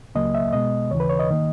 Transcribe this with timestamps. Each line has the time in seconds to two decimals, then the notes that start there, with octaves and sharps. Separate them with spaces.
0.15 C#2 C#3 F#3 A#3 D#5
0.35 E5
0.53 B2 G#3 B3 D#5
0.91 D#2 C#3 E3 C#5
1.00 B4
1.09 C#5
1.19 D#5
1.30 D#3 A#3